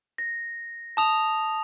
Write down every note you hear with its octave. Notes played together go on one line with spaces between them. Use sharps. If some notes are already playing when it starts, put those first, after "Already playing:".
A#6
A5 D#6 F7